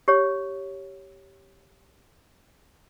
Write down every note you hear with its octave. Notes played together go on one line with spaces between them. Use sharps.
G4 C#5